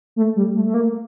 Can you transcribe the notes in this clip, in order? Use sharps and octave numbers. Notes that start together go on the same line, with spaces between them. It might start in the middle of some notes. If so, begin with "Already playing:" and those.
A3
G3
A3
A3
A#3